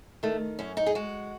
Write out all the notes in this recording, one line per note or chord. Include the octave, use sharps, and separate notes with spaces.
D#3 A3
F#2 C#4
D#4
G#4
G#3 F#4